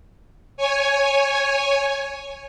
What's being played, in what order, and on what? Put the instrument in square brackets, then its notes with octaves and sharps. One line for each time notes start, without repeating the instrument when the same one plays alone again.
[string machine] C#5 G#5